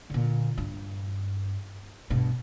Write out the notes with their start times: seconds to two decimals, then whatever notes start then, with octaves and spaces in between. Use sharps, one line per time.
0.10 A#2 D3
0.58 G2
2.10 G2 B2